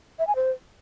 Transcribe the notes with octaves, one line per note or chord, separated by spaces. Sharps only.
E5
G#5
C5